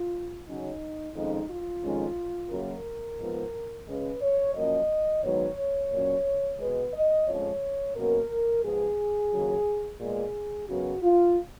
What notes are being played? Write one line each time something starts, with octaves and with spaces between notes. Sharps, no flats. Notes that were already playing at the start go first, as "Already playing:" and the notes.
Already playing: F4
C#3 F#3 C#4 D#4
F2 D#3 G#3 C#4 D#4
F4
F2 D#3 G#3 C#4
F#2 C#3 F#3 A#3 A#4
G#2 F3 B3
C#3 G#3 C#4 B4
C#5
F#2 F3 A#3 C#4 D#5
G#2 D#3 F#3 B3 C#5
A#2 F#3 C#4
B2 G#3 B3 B4
D#5
F2 F3 G#3 C#4 C#5
B2 F#3 A#3 C#4 A#4
G#2 F3 B3 G#4
D#2 C#3 F#3
A#2 G#3 B3 G#4
F#2 C#3 F#3 B3 F#4
F4